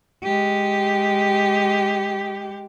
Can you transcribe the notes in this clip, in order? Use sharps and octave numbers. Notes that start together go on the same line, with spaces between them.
G#3 G4